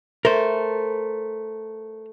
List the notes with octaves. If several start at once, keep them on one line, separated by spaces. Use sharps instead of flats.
A3 A#4 C5